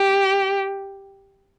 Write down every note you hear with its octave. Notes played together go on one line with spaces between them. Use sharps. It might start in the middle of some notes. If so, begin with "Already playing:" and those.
Already playing: G4